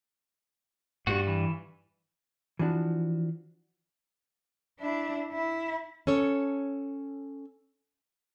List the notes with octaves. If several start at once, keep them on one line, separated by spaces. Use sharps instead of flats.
G2 F#4
E3
E3 F3 D4 F#4
D4 E4
E4
C#4 A4 C#5